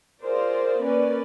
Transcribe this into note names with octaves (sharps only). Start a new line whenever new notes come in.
F4 G#4 A#4 C5 D5
A#3 C#4 B4 D5